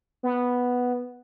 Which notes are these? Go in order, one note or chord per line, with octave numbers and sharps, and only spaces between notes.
B3